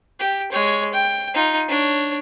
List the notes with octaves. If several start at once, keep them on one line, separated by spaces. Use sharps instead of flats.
G4
G#3 C#5
G5
D#4 F4
D4 C#5